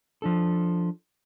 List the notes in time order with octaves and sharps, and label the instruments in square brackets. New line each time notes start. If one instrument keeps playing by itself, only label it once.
[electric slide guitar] F3 D4 A4